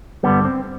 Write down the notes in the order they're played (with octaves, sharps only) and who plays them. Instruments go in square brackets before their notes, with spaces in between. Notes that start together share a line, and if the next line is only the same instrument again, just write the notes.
[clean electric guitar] G2 D3 G3 B3
C4